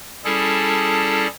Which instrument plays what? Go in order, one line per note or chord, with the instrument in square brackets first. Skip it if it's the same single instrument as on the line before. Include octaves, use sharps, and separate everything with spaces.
[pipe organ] G3 C#4 E4 G#4 A4 A5